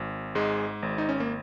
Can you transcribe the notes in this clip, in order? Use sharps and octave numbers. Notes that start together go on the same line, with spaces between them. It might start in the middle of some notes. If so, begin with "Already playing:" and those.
Already playing: G#1
G#2 G#3
G#1
D#4
C#4
A#3